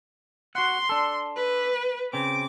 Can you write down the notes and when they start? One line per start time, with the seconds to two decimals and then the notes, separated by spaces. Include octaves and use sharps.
0.55 F#4 F#5 C6
0.89 D4 A4
1.36 B4
2.13 C#3 C4 D6